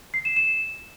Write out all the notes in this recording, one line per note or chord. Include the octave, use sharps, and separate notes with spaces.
C7
E7
E7